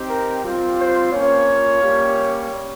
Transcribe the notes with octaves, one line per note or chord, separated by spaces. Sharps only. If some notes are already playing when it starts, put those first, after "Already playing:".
Already playing: C4 D#4 G4
A#4
G3 C4 F4
C5
A#3 C#4 F4 C#5
G3 A#3 C#4 G4